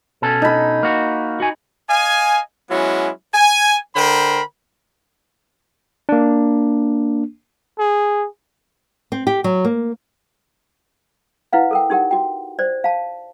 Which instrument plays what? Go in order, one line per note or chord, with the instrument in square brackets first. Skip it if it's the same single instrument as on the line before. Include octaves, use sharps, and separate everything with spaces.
[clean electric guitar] B2 C#4 A4
[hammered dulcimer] D#4 B5
[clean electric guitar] A#3 F#4
F#4 G#5
[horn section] D#5 F5 G#5
F#3 G#3 B3 C#4 E4
G#5
D3 A#4 C5 G5 B5
[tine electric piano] A#3 D4
[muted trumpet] G#4
[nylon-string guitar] C4
G4
F#3
A#3
[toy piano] E4 B4 F5 F#5
A4 A#4 G5
D#4 G4 A#4 F#5
F#4 G5
C5 D5
F5 A5